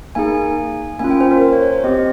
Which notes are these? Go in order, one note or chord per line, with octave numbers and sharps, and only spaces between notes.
A#3 D#4 G#4 G#5
A#3 C#4 F4 G#5
G5
C5
A#4
C5
C#5
C#5
C5
C4 G4 D#5